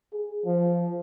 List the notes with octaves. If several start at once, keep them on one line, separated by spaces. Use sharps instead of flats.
G#4
F3